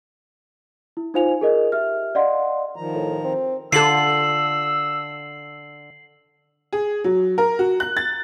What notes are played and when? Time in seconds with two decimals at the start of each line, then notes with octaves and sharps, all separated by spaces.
0.97 E4
1.14 D#4 F4 C5 F5 G#5 F7
1.41 G#4 A#4 D#5
1.72 G4 E5 F6
2.15 D5 D#5 F5 F#5 C6
2.76 D#3 F3 A#5
2.94 A2
3.24 C4
3.72 D3 F4 A4 E6 C7 F#7
6.73 G#4
7.04 F#3
7.38 A#4
7.59 F#4
7.80 F#6
7.97 A6